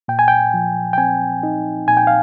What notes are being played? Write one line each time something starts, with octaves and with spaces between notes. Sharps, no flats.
A#2 G5
G#5
G5
F3
G5
C4 G#5
D#4
A#2 G#5
G5
F5